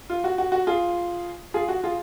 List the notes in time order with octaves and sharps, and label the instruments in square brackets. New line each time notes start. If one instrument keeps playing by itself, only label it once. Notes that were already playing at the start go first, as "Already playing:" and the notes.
[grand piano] F4
F#4
F#4
F#4
F4 G#4
F4 G#4
F#4
F4 G#4